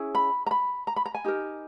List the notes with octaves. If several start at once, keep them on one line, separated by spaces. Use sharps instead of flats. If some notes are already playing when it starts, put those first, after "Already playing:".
Already playing: C#4 E4 G#4
B5
A#5
B5
A#5
B5
A#5
G#5
D#4 G4 A#4